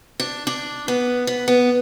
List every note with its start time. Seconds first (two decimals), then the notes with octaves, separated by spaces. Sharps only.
0.20 D4
0.47 D4
0.88 B3
1.27 B3
1.48 B3